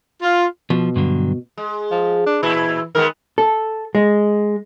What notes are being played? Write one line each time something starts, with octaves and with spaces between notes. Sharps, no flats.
F4
B2 F3
G2 D3 F#3
G#3
F3
D4
A#2 E3 E4
D#3 G#3 B3 A#4
A4
G#3